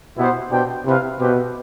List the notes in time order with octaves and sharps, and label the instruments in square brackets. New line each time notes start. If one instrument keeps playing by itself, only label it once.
[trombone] B2 [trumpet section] B3 E4 G4 C5
[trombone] B2 [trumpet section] D4 G4 C5 G5
[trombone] C3 [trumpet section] E4 B4 F5
[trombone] B2 [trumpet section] C4 G4 B4